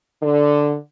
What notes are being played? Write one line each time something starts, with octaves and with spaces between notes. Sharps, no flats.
D3